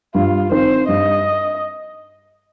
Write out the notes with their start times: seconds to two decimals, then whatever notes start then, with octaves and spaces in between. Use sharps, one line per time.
0.14 G2 F4
0.51 D#3 C4 C5
0.87 G2 D#5